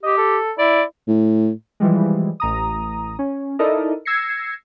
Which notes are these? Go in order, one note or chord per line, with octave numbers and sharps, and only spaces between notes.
G4 D#5
A4
E4 D5
A2
E3 F3 G3 G#3
A1 A#5 D#6
C#4
D#4 E4 A4 A#4 D5 D#5
E6 G#6 A#6 C7 C#7